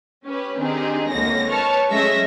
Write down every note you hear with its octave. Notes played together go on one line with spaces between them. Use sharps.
C#4 G4 B4
D#3 C4 D4 D#4 G4 G#4
G#1 C#2 D3 A#3 C#5 A#6
B4 C#5 A5 C#6 F6
F#3 G#3 A3 C#4 E5 A#6